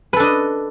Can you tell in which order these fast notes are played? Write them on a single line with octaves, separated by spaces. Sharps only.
B4 A4 D4 D#5